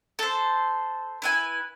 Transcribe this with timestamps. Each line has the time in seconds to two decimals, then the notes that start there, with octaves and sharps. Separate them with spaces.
0.19 A4 C5
1.22 E4 B4 G#5